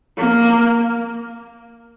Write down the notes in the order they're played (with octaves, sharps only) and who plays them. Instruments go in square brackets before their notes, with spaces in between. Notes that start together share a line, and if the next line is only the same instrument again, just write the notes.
[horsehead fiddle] A#3